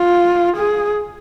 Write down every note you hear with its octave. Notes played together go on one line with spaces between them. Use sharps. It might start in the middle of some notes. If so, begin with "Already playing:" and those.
Already playing: F4
G#4